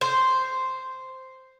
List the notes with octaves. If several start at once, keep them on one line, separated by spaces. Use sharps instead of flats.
C5